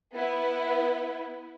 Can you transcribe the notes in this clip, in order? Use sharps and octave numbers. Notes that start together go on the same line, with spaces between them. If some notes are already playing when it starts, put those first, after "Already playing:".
B3 E4 B4